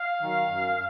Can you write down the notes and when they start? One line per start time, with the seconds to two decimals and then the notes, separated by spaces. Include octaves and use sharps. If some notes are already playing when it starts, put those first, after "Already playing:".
Already playing: F5
0.19 D#3 F#3
0.48 F#2